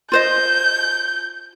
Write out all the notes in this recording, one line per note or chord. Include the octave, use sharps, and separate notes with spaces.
F4 C5 D#5 G6